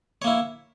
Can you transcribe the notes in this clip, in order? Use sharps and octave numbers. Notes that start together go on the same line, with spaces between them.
A#3 E4 C#5